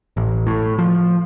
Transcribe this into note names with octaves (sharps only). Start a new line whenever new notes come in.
A1
A2
F3